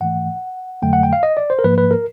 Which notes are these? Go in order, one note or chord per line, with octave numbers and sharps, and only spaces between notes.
G#2 E3 A3 F#5
F2 D3 F#3 A3 G5
F#5
G5
F5
D#5
D5
C5
A#4
G#2 F3 A#3 B4
B4
A#4